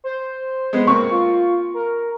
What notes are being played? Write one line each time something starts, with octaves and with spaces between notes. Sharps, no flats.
C5
G#3 B3
A#3 C4 C#6
F4
A#4